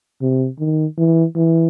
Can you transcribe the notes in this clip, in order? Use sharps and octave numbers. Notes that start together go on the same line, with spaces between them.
C3
D#3
E3
E3